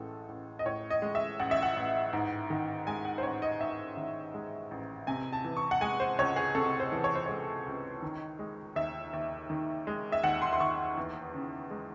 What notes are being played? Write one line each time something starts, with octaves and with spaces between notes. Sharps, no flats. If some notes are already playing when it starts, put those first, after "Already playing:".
Already playing: A1 A2 G#3 A4
A1
D#5
A2 C#5
D#5
G#3
E5
A1 F#5
E5
F#5
A1
G#2
D#3
G#3 G#5
F#5
C5
A1 C#5
D#5
G#2 E5
D#3
G#3
A1
C3 G#5
A5
E3
C#6
F#5
G#3 G#5
C5
C#2 C#5
G#4
C3 A4
C5
E3
C#5
C5
G#3 C#5
C#2
D#3
G#3
D#2 E5
D#2
D#3
G#3
E5
D#2 F#5
C6
C6
D#2 C#6
E2
C#3
G#3